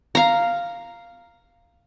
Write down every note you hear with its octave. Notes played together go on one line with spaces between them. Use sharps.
F5 A#5